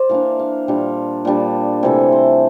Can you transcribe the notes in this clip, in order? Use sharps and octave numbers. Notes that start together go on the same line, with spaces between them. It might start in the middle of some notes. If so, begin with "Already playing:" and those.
Already playing: C5 D5
E3 A#3 D4 F5
F5
A#2 G3 D4
A#2 G3 D4
C3 E3 A3 E5
C5